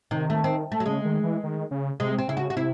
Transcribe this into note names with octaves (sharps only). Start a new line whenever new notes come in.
C3 D#3
A3
C4
A3
F#3
C#3 G#3
D#3
E3
D#3
C#3
C3 G#3
C4
C#3 E4
F#4
F#4
C3 E4